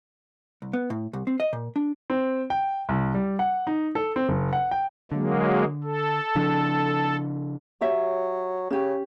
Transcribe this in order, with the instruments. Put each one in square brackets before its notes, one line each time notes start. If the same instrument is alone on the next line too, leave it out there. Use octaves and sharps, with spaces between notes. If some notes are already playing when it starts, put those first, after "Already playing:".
[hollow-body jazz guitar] C2
B3
A2
C2
C4
D#5
A#2
D4
[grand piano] C4
G5
C2
G3
F#5
D#4
A4
C4
F#1
F#5
G5
[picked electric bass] D3 [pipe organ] F#3 G#3 A#3
[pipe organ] A4
[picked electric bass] C#3 F3 D4
[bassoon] F#3 [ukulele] G4 C#5 E5
[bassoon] C#3 [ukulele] C#4 G4